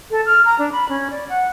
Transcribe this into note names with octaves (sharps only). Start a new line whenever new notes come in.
A4
F6
A#5
D4
B5
C#4
D5
F#5